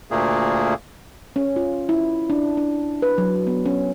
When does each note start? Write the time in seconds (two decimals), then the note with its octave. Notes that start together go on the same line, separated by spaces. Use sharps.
0.11 D2 A#2 A3 A#3 G#4
1.36 C#4
1.56 F4
1.89 E4
2.30 D4
2.57 D4
3.02 B4
3.18 F#3
3.47 B3
3.66 C#4